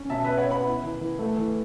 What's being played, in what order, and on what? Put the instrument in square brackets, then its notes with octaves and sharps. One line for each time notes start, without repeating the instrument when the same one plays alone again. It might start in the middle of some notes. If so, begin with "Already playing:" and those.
Already playing: [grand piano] C#4
[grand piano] B2 [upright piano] E5 A5
[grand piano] B3 [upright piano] B4 E5
[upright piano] C#5 F#5
[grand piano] B3 [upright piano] F#5 B5
[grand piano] E4
E3
E3
A3
E3